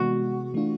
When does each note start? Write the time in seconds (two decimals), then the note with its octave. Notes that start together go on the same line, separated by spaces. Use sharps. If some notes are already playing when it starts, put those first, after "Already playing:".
Already playing: C3 E3 G#3 B3 F#4
0.54 E3 A3 D4 F4